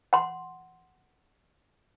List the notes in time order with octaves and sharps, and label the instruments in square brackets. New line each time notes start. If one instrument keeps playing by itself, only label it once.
[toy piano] F#5 C6